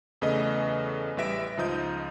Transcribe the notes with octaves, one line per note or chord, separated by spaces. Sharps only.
E2 C#3 A3 B4 D#5
A1 G3 B4 E5 A#6 D7
C#2 F3 D#4 D#6 G6